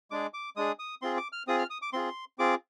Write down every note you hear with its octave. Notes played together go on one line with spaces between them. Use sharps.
G#3 D4 G#4 D6
D6
G#3 D4 G#4 D#6
D#6
C4 F4 G#4 C6
D6
F6
C4 F4 G#4 D#6
F6
D#6
D6
C4 F4 G#4 C6
C4 F4 G#4 D6